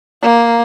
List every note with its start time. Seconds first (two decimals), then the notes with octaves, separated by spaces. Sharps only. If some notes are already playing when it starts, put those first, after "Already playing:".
0.22 A#3